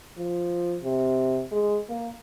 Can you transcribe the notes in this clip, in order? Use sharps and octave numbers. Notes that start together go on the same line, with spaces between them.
F3
C3
G#3
A#3